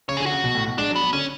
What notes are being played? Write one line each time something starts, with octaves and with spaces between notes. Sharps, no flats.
C#3 C#5
D3 G#4
F#4
C#3
B2
A2
B2
G#3 D4
F#3
B3
F#3
D3 C#4